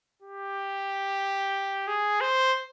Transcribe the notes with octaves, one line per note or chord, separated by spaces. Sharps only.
G4
G#4
C5